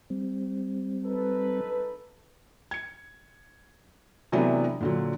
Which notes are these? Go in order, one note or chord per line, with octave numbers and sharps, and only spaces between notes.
G3 C4
D#4 A4 B4
G#6 C#7
C3 E3 F#3 A3 B3 D4
A#2 D3 F#3